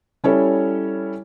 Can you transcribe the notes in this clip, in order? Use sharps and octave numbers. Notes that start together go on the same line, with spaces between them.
G3 C#4 E4 A4 C#5